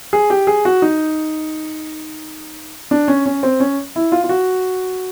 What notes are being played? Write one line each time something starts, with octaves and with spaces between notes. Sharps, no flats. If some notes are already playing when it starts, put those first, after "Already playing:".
G#4
G4
G#4
F#4
D#4
D4
C#4
C#4
C4
C#4
E4
F4
F4
F#4